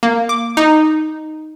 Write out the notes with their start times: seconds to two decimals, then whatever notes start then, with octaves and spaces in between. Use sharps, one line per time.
0.03 A#3
0.29 D6
0.57 D#4